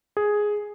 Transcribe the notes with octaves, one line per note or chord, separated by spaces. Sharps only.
G#4